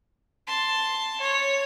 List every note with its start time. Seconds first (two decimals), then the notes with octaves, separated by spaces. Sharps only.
0.47 A5 C6
1.20 C#5